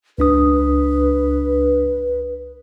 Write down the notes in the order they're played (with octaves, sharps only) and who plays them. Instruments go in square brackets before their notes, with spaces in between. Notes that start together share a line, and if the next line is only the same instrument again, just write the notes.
[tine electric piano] C#2 D4 D#6 [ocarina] B4